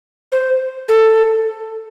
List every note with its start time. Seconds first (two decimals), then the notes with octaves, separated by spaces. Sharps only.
0.32 C5
0.88 A4